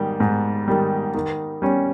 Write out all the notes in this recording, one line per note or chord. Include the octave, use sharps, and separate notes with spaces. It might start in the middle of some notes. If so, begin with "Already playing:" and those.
Already playing: G#2 D#3 G3
G#2
D#3 G3
D#3
G3 C#4